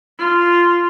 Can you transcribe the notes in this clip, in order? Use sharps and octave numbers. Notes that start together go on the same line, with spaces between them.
F4